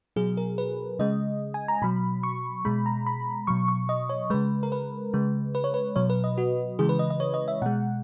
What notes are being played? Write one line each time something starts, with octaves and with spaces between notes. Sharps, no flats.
B2 F#3 G#4
A#4
B4
C#3 G#3 D#5
G#5
A#5
B2 F#3 B5
C#6
B2 G#3 B5
A#5
B5
B2 F#3 C#6
C#6
D#5
C#5
C#3 G#3 B4
A#4
B4
C#3 G#3
B4
C#5
B4
B2 F#3 C#5
B4
D#5
F#4
C#3 E3 G#3 G#4
B4
D#5
D#5
C#5
D#5
E5
B2 G#3 F#5